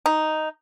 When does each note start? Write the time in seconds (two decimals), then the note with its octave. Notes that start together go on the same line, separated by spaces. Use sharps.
0.06 D#4